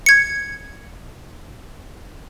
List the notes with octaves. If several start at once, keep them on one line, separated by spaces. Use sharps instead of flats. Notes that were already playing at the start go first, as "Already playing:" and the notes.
G#6 C#7